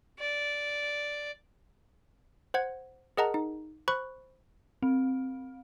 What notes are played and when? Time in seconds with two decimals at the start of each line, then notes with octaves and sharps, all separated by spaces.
0.19 D5
2.54 C5 F#5 G#6
3.17 G#4 A#4 D#5 F#5 A5 A#5
3.34 D#4
3.88 C5 B5 C#6 F#6
4.83 C4